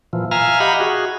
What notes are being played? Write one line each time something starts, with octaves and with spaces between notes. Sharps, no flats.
A#2 E3 F3
E5 F5 G#5 A#5 F6
G4 D#5 F5 F#5 B5
F#4 G#4